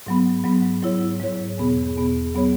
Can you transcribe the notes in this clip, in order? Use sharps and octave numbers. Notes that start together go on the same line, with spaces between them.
G#2 F#3 B3
G#2 F#3 B3
G#2 F#3 E4 C#5
G#2 F#3 E4 C#5
E2 B2 B3 G#4
E2 B2 B3 G#4
F#3 B3 G#4 C#5